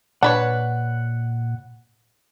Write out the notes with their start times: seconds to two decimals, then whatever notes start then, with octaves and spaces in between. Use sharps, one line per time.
0.23 A#2 D4 B4 C#5 F#5